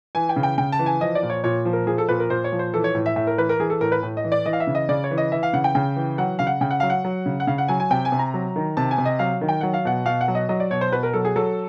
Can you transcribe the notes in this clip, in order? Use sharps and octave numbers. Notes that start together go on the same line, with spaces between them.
E3 G#5
G5
C#3
G5
C#3 G5
A5
E3
G#5
F3 D#5
D5
A#2
C#5
A#2 C#5
F3
A#4
F3 G#4
A4
A#2 B4
A#4
A#2 C5
C#5
F3
C5
E3 A4
C#5
A2
E5
A2 E5
A#4
E3 B4
A#4
E3 G#4
A4
A2 A#4
B4
A2
D#5
E3
D5
E3 D#5
F5
E5
C#3
D#5
C#3 D5
C#5
E3
D#5
E3 E5
F5
C#3 F#5
G5
C#3 G5
E3
F#3 F#5
C#3 F5
F#5
C#3 G5
F#5
F#3 F5
F#5
F#3
C#3
F#5
C#3 F5
F#5
F#3 G#5
G#5
C3 G5
G#5
C3
A#5
F#3
D#3
C3 A5
G#5
C3
D#5
F#3 F5
D#3
G5
F#3 F#5
F5
B2 F#5
B2 F5
F#5
F#3
D#5
F#3 D#5
D5
B2 C#5
C5
B2 B4
A#4
F#3 A4
G#4
F#3 A4